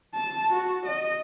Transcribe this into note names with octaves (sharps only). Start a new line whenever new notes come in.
A5
F#4
D#5